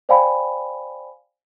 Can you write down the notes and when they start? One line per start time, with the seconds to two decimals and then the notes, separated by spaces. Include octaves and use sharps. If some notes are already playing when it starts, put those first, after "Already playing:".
0.09 C5 D5 F5 G5 G#5 B5